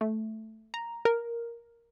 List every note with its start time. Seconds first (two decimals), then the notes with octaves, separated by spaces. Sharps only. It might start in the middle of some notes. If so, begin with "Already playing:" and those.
0.01 A3
0.74 A#5
1.05 A#4